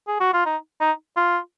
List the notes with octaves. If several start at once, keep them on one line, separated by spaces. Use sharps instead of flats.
G#4
F#4
F4
D#4
D#4
F4